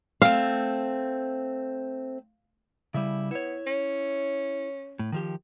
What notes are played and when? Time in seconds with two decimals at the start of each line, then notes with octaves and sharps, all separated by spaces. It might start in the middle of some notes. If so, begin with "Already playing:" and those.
0.22 A3 C4 F5
2.94 C#3 G3 E4
3.31 B3 E4 C#5
3.67 C#4
4.99 A2
5.12 D#3 F3 G4